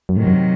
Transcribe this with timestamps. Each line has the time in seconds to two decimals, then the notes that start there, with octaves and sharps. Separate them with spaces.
0.09 F#2
0.17 A2 C3 D#3 F#3
0.27 F#2